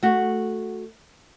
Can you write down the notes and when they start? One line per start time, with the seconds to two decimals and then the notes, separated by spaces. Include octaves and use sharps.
0.03 A3 F#4